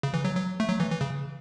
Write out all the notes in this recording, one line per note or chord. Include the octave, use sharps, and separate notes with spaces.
C#3
E3
F#3
F#3
A3
F#3
E3
E3
C#3